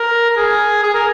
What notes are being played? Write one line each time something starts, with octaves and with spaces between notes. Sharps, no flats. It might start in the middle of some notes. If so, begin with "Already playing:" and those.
Already playing: A#4
A#4
G#4
G#4
A#4